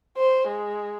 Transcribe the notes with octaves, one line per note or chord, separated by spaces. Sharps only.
C5
G#3